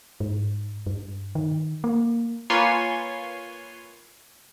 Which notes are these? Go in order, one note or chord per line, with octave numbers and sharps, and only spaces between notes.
G#2
G2
D#3
A#3
A#3 F4 B4 C#5 G#5 C6